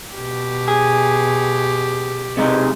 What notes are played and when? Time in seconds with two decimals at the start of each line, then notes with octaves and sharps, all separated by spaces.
0.14 B2 G4
0.68 G#4
2.37 C3 G#3 D#4